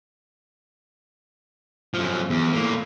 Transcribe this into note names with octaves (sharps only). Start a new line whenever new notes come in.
F#2 F3
E2
A2 A#3